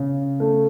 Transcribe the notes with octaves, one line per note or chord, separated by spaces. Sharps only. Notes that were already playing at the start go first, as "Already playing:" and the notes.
Already playing: C#3
A3